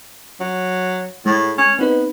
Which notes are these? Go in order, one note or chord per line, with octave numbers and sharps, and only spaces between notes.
F#3
A2 G#3
C#4
B3 C4 D#4 B4